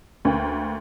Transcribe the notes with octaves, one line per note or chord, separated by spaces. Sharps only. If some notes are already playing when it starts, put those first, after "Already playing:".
D2 A#3 B4 G5